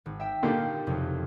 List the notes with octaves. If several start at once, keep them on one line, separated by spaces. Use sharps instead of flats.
G#1
E5 G5
A#2 D3 D#3 D#4 G4 F5
F#1 F2 C3